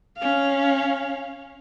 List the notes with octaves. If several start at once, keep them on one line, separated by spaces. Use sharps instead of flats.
C#4 F5